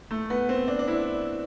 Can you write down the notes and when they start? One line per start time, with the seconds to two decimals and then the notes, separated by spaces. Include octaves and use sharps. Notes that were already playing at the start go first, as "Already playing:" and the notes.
0.11 A3
0.30 B3
0.49 C4
0.68 D4
0.79 D4
0.87 E4